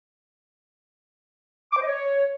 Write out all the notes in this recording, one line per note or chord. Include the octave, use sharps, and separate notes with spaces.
D6
C5
D#5
C#5